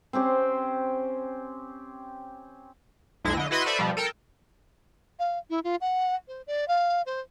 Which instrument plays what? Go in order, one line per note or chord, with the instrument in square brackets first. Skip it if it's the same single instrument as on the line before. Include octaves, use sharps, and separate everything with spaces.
[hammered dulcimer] C4 C#4 G4 C5
[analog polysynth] B1 F2 G#3 E4 A#6
D3 D#5
E4 F#4 B4 D#5 B5 C6
A4 B4 C5 D5 E5 B5
B2 F3 G3
A4 A#4 G5 A5
[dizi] F5
E4
F4
F#5
C5
D5
F5
C5